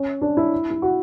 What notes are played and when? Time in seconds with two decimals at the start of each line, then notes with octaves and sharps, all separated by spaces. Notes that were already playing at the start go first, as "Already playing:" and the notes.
Already playing: C#4
0.22 D4
0.37 E4
0.71 E4
0.82 F#4